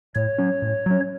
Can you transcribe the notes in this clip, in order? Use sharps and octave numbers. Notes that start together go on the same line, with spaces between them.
A2 C#5
F#3 C#4
A2
F#3 C#4